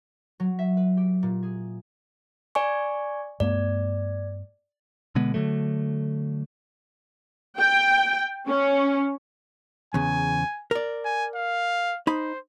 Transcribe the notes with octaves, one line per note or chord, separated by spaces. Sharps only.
F#3
E5
B4
G4
A#2
G#4
D5 G#5 C#6
G2 A3 B3 D5
B2 D3 G#3 B3
D3 F3 F#3 A3
G5
C#4
E2 C#3 G#5
A#4 D5
G#5
F5
D#4 C5 B5